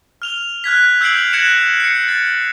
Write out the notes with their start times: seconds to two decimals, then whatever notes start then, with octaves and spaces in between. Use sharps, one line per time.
0.22 F6 F7 G7
0.64 F6 F#6 G#6 B6
1.01 E6 G6 G#6 C7 D7 F#7
1.33 F#6 G#6 A#6 C#7 E7 F#7
1.80 C7 C#7
2.08 A6